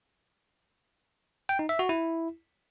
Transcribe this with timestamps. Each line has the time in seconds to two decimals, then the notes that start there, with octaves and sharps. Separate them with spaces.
1.49 G5
1.59 D#4
1.69 E5
1.79 F#4
1.89 E4